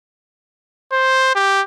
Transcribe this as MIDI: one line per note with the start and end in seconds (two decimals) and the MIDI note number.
0.92 1.31 72
1.35 1.62 67